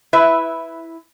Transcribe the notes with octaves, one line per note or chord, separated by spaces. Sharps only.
E4 B4 E5